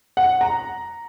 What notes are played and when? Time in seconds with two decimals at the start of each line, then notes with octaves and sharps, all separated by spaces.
0.17 F#5
0.41 A#5